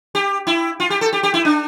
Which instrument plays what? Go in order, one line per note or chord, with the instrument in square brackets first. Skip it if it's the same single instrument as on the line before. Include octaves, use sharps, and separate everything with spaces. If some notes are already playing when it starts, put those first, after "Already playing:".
[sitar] G4
E4
F4
G4
A4
G4
G4
E4
D4